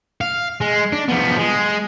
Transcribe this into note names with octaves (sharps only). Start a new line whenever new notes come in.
F5
G#3
D4
F3 B3
G#3